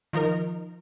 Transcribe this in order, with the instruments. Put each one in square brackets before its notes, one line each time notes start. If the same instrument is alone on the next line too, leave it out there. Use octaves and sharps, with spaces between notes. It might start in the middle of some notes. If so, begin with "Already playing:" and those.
[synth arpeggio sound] D#3 F3 D#4 A#4